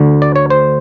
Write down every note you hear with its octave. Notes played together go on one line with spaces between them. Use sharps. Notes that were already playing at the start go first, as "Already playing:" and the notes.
Already playing: D2 D3
D5
C#5
C5